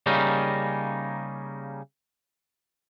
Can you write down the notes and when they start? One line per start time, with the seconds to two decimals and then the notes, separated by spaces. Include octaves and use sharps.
0.06 C#3 G3 A#3 C#4 D#4